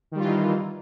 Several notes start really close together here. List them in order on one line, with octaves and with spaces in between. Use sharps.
D#3 G3 F4 E3 D#4